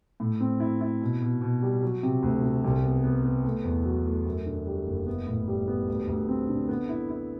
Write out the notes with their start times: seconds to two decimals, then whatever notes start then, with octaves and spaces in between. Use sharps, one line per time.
0.20 A2
0.40 C4
0.60 E4
0.81 E4
1.01 B2
1.22 B2
1.41 B2
1.62 G3
1.83 F#3
2.03 C3
2.23 D2
2.43 C3
2.64 C2
2.84 B3
3.04 B3
3.24 B3
3.45 A3
3.64 E2
3.85 F#3
4.06 A3
4.26 F#2
4.46 D3
4.67 G3
4.86 F#1
5.07 B3
5.27 A2
5.48 G3
5.68 B3
5.88 D2
6.08 D2
6.29 C4
6.49 D3
6.69 B3
6.89 E4
7.09 E4